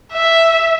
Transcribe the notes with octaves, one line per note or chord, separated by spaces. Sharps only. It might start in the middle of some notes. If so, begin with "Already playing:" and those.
E5